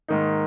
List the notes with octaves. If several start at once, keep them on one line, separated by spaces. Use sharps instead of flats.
G#2 D#3 A#3 D#4